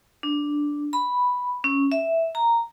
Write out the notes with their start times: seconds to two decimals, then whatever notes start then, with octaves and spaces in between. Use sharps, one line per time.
0.23 D4
0.93 B5
1.64 C#4
1.92 E5
2.35 A#5